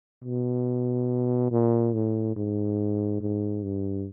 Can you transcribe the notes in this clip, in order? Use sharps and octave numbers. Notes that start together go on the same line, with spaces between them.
B2
A#2
A2
G#2
G#2
G2